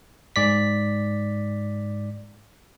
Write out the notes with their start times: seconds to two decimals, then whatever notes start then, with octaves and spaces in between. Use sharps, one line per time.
0.36 G#2 D5 B6